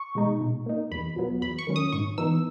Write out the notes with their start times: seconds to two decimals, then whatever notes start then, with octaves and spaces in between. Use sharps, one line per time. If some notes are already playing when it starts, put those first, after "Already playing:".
Already playing: C#6
0.15 B2 G#3 D#4
0.41 B2
0.66 A#3 D#4
0.91 E2 B5
1.16 B2 F#3 B3
1.42 E2 B5
1.59 C#6
1.67 D#3 F#3 C#4
1.76 D#6
1.92 G#2 C#6
2.18 E3 B3 D#4 E6